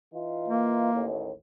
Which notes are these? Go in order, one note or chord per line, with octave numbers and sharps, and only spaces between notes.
E3 D#4 F4
A#3
A1 D#2